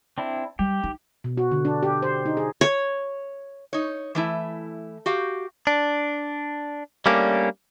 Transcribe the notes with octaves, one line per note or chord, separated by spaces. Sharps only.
C4 D4 E4
G3 G4
D#4
B2
F#4
D3
D4
G4
C5
D#4
G#4
C#5
D#4 C#5
E3 A3 E4
F#4 G4 F5
D4
G3 A3 A#3 C#4 D4 G4